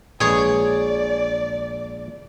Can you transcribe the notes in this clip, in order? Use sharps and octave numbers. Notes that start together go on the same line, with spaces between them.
A#1 G#3 G#4 B4 C#5 D5